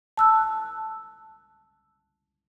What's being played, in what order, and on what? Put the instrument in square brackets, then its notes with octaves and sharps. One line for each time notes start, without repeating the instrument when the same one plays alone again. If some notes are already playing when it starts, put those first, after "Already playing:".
[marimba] A5 E6 F#6